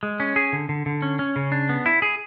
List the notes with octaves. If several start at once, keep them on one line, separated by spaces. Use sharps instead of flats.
G#3
C#4
G#4
D3
D3
D3
C#4
C#4
C#3
D4
B3
E4
G#4